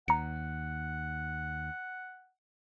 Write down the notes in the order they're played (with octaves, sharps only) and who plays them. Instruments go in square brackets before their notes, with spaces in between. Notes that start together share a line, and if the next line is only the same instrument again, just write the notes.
[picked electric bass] D#2 [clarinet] F#5 [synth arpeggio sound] A#5 C#7